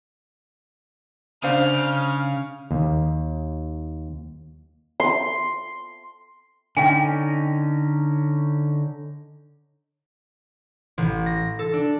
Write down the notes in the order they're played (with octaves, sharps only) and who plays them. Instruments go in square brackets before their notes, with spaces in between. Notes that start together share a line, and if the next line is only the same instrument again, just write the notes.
[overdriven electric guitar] C#3 [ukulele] D4 C5 F5 [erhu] F6
[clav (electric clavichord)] D#2
[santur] C6
[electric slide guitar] D3 C#4 D#4 [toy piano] G5 G#5
[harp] A1
A#6
A4
D4